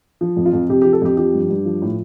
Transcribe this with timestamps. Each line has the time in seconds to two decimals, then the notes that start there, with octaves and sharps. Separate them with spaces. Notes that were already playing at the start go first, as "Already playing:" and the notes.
0.21 F3
0.37 F2
0.45 F4
0.53 F2
0.69 C3 G4
0.82 F3 G4
0.93 A4
1.02 F2 G4
1.17 F3 G4
1.34 G2
1.50 G2
1.65 F3
1.82 A2